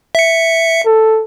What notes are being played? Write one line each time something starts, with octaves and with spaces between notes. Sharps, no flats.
E5 C#7
A4